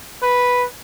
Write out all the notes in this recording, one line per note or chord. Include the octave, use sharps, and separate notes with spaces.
B4